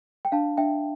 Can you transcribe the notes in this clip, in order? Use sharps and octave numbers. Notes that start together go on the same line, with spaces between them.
G5
D4 F5 A5
D4 E5 G5